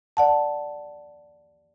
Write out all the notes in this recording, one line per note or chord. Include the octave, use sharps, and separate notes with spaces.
D5 F#5 A5